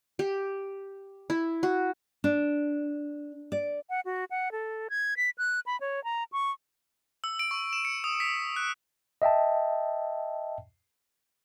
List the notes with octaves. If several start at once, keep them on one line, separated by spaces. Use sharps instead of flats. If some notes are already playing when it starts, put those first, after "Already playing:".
G4
E4
F#4
D4
D5
F#5
F#4
F#5
A4
G#6
B6
F#6
B5
C#5
A#5
C#6
E6
D7
C#6
E7
C#7
D#6
B6
F#6
D#5 E5 G5 A5